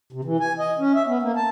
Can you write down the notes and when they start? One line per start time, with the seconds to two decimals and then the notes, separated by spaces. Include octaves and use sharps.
0.12 C3
0.24 E3
0.40 G#5
0.59 D#5
0.79 C#4
0.95 E5
1.06 B3
1.23 A#3
1.36 A5